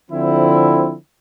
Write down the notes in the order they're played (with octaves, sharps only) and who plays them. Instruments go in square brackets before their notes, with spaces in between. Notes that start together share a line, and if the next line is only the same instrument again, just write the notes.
[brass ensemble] D3 F3 C4 E4